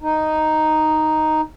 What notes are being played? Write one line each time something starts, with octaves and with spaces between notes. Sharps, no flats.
D#4